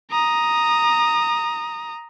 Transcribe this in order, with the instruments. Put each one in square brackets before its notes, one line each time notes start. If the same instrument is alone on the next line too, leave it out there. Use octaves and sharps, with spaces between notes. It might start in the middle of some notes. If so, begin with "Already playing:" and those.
[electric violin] A#5 D#6